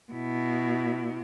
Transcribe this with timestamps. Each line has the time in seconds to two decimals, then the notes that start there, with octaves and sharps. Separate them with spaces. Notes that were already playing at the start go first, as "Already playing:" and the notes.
0.12 B2 E4